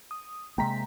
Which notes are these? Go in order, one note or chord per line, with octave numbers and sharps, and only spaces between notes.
D#6
C3 G#3 A#3 G5 A#5 B6